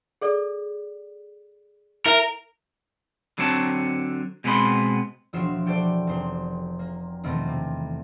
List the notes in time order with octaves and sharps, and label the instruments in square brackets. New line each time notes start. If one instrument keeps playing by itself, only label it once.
[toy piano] G#4 A4 D5
[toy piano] E4 E5 [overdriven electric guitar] A#4
[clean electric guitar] D3 F#3 C4 C#5 A5
B2 G#3 B3 C4 B5 C6
[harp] E1 F3 F4 F#4 C7 E7
F#4 G4 A4 C5 D5
F1 C5
A#3
E2 B2 D#3 A3 A#3 C4
C3